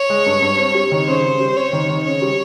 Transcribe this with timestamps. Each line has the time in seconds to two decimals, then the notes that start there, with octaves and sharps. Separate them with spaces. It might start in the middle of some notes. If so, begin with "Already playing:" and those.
Already playing: C#5
0.10 G#3
0.26 G2
0.42 G2
0.58 C4
0.74 G3
0.91 D#3
1.07 C#3 C5
1.23 C#3
1.40 G3
1.57 C4 C#5
1.73 D#3
1.89 D#3
2.05 C#3 C#5
2.22 G3